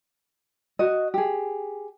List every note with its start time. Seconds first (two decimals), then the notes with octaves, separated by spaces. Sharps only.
0.79 F#4 D#5
1.14 G4 G#4